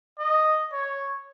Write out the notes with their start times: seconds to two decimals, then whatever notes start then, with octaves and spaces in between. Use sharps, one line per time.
0.19 D#5
0.72 C#5